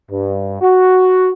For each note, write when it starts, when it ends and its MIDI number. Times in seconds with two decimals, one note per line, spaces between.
0.10 0.59 43
0.61 1.29 66